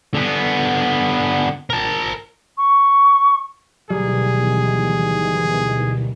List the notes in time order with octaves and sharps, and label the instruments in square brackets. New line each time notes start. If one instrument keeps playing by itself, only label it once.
[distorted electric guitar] D3 B3
A#4 A5
[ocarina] C#6
[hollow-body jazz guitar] D2 F#3 G3 [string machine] B2 D#3 E3 [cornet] G#4